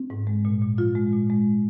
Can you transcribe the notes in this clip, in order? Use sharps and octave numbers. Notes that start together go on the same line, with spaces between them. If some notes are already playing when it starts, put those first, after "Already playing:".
Already playing: C4
G#2
G#3
A#2
A#2
F3 F4
G#3
A#2
G#3